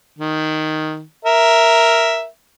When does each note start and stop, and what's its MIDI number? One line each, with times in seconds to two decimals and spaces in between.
0.19 1.02 51
1.25 2.25 70
1.25 2.25 76